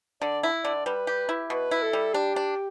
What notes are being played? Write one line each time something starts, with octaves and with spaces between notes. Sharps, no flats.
D3 D5
E4
D3 D5
G3 B4
G4
E4
B2 B4
E4
A4
G3
D4 G4
D4